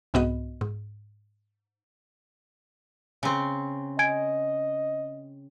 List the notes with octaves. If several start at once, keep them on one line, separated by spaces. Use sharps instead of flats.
C2 G#2 B3 F#4 D#5
G#2
C#3 C4
D#5 G#5 G#6 D7